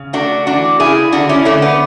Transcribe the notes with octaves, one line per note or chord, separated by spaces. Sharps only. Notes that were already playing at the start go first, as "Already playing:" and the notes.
Already playing: C#3
A3 D4 F#4
E3 D4 F#4
C#3 E4 G#4
D3 D4 F#4
C#4 E4
D3 A3 C#4
B3